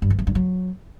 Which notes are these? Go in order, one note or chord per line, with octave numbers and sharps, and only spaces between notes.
G2
E3
F3
G2
F#3